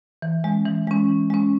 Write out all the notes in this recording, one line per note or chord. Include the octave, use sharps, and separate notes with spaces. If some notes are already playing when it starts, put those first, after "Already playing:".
E3
G#3 C#4
E3
G#3 C#4
E3
G#3 C#4